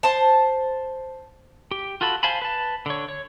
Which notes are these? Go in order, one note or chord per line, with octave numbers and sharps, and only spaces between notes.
C5 A5
G4
F4 F#4 A4 A5 B5
C5 F5 G#5 A5 B5
B4 A5
D3 C#5
C#5